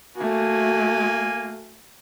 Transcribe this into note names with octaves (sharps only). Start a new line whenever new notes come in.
A3 A#3 F#4 G#5